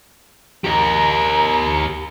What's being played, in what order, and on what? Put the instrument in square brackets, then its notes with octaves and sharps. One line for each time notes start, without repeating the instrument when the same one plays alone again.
[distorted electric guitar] G4 A#4 [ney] A#5